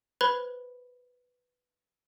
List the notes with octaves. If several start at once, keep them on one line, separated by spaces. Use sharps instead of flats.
B4 C5 B5 F#6 G#6